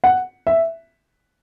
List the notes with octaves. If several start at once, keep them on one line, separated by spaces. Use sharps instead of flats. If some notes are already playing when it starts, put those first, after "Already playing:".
F#5
E5